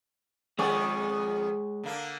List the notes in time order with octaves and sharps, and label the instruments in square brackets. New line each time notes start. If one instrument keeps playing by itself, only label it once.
[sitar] F2 D#3 D5 [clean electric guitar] G#3 G#4 C#5
[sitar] D3 A#3 D4